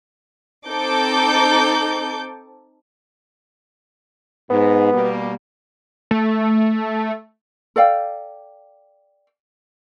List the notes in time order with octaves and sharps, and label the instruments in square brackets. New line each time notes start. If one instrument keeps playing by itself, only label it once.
[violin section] C4 D#4 A4 D6 G6
[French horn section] G#2 [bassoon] B3
[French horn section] B2 G3 A#3
[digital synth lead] A3
[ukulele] A4 D5 F5 G5